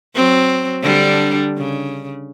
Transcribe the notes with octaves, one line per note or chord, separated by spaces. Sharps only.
F#3 C4
D3 G3 D4
C#3